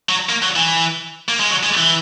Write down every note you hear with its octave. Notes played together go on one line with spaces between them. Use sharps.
F#3
A#3
F#3
E3
A#3
G#3
F#3
G#3
E3